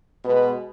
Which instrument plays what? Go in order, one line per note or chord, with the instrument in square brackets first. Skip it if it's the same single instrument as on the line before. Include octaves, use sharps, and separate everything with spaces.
[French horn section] B2 G#3 B3 B4